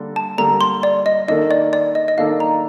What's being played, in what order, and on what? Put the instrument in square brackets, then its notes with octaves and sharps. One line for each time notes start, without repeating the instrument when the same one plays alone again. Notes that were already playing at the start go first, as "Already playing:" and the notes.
Already playing: [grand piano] D3 G3 A#3 D4 A4
[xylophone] A5
[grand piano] D3 G3 A#3 D4 A4 [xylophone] A#5
[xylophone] C6
D5
D#5
[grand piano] D#3 A#3 D4 A4 [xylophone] D#5
[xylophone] D5
D5
D#5
D#5
[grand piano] D#3 A#3 D4 A4 [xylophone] F5
[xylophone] A#5